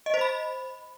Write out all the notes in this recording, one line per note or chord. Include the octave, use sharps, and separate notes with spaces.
D#5
C5
B5